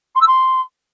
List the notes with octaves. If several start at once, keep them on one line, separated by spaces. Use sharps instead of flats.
C6
E6
C6